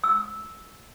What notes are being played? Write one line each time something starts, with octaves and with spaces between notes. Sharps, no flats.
E6